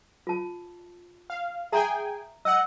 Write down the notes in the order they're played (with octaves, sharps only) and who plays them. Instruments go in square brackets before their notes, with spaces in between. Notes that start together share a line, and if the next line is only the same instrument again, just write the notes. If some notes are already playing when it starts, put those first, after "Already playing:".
[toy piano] F4 A5
[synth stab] F5
[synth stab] G#4 G5 G#5 [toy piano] E5 A#5 C6
[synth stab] D#5 F#5 [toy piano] E6